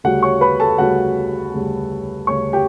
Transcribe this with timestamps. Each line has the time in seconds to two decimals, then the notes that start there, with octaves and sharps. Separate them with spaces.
0.04 D2 C#3 G3 F#4 F#5
0.23 C#5 C#6
0.41 B4 B5
0.60 A4 A5
0.78 D2 C#3 G3 F#4 F#5
1.54 D2 C#3 G3
2.27 D2 C#3 G3 C#5 C#6
2.53 G4 G5